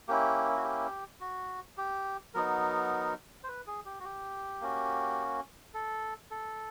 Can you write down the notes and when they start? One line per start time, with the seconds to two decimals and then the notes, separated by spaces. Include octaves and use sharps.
0.08 A#3 C#4 E4 G4
0.56 F#4
0.65 G4
1.21 F#4
1.77 G4
2.34 F#3 B3 D#4 A#4
3.44 C5
3.48 B4
3.67 G#4
3.86 G4
4.00 F#4
4.04 G4
4.61 A#3 C#4 F#4
5.74 A4
6.31 A4